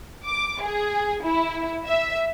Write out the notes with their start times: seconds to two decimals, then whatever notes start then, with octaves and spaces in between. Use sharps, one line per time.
0.24 D6
0.62 G#4
1.24 E4
1.86 E5